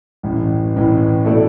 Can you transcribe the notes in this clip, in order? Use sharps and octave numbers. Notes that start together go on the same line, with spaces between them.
A1 A2 E3
A1 A2 E3
B2 A3 E4 A4 D5